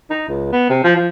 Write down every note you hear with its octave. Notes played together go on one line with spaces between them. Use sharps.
D#4
C#2
B3
C3
F3
F3